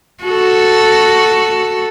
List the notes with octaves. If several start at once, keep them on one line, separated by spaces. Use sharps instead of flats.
F#4 A4